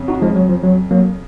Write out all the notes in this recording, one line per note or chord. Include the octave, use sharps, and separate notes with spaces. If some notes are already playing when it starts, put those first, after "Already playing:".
Already playing: F2 C#3
D#4 F#4
F3 G#3
F#3
F3
F#3
F#3 A#3